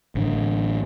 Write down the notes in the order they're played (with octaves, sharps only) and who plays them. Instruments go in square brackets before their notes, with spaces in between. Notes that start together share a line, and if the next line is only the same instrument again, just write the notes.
[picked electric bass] A1 D3